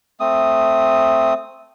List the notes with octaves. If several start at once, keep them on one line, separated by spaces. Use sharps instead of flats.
A3 C4 D#6